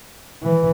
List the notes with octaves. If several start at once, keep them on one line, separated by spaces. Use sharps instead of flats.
E3